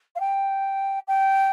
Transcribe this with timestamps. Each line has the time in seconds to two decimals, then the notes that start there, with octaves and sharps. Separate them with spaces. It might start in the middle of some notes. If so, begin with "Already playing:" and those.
0.15 F5
0.20 G5
1.08 G5